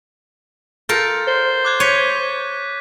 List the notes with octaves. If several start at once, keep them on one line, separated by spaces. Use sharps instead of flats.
F4 A4 A#4 G6 A6
C5
D6 F#6 G#6
C#5 B6 D#7